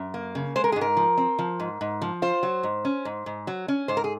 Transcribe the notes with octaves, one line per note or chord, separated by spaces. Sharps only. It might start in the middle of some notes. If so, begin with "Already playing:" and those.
Already playing: F#2
A#3
C#3
G#3 C5
A#4
G#4
G#2
A#4
F3
C4
F3
G#2
G#2
F3
F4 C5
F#3
G#2
C#4
G#2
G#2
F#3
C#4
G#2 C5
A#4
G#4